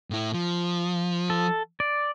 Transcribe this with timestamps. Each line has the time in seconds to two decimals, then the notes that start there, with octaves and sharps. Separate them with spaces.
0.10 A2 E4
0.34 F3
1.30 A4
1.80 D5